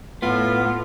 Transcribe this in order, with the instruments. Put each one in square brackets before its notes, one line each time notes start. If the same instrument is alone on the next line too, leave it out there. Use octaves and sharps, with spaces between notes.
[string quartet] A2 [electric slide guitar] B3 [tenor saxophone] F4